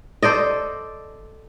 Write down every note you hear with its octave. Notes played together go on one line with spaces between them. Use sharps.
A4 C5 D5 D#5